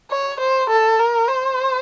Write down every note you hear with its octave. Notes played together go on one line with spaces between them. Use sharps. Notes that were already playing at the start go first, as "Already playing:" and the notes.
C#5
C5
A4
A#4
C5